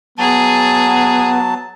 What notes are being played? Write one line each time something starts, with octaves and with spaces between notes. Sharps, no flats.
F#3 B3 G#4 A5